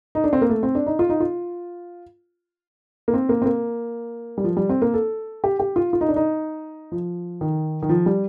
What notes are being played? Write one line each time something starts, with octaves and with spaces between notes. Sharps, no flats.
D#4
D4
C4
A#3
A3
C4
D4
D#4
F4
D#4
F4
A#3
C4
A#3
C4
A#3
G3
F3
G3
C4
A#3
A4
G4
G4
F4
F4
D#4
D4
D#4
F3
D#3
D#3
F3
G3